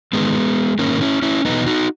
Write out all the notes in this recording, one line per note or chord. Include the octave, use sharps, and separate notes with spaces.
G#2 D#3 G#3 B3
G#2 D#3 A#3 C#4
C#4 E4
C#4 E4
E2 B2 B3 D#4
D#4 F#4